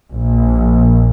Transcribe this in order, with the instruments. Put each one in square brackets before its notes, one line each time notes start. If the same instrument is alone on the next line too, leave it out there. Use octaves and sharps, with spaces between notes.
[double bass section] A#1